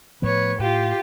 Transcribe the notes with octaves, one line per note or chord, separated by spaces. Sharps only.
A2 F3 B3 B4 C#5
A2 F4 G4